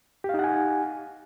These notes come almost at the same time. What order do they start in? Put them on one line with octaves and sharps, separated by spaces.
G4 F5 D#4 F#5 G#5